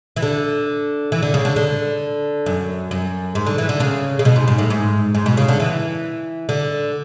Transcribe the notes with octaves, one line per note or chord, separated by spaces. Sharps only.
E3
D3
E3
D3
C#3
D3
D3
F#2
F#2
G#2
D3
E3
D3
C#3
C#3
B2
G#2
G#2
A2
G#2
G#2
B2
C#3
D3
E3
D3